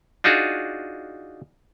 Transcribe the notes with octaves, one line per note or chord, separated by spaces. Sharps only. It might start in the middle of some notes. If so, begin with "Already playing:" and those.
D4 D#4 F4 F#4 G#4